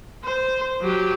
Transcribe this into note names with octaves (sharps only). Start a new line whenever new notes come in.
C5
F#3 G4